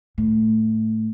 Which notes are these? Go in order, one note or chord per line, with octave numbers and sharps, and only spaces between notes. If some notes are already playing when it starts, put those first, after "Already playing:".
A2